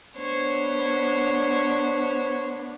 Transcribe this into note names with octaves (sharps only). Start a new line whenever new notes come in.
B3 D4 C5 C#5